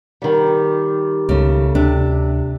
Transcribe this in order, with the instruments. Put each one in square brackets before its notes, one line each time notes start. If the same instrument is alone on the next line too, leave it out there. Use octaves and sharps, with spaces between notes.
[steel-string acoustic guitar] D#3 G3
[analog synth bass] C#2 [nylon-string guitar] C#3 A3
[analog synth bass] D2 [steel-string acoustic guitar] C3 [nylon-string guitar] D4